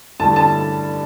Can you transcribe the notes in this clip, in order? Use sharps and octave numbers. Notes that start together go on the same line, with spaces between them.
G2 D3 A3 E4 A5
A5